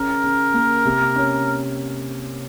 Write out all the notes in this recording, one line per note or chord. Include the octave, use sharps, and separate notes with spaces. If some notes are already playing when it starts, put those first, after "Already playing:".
Already playing: C#3 C#4 A#4
C#3
A#3
C3
C#4